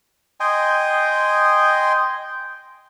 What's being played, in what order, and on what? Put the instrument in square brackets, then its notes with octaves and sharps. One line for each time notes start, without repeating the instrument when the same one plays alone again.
[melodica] D#5 G5 G#5 C6